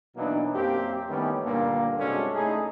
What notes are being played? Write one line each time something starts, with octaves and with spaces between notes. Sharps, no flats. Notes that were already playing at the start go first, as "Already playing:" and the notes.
B2 E3 F#3 A#3 D4 D#4
F#2 A#3 C4 G4
D#3 E3 G3 A3 B3 C#4
G2 A#2 D3 A#3
C3 G#3 C#4 D4 F#4 A4
A3 D#4 E4 G#4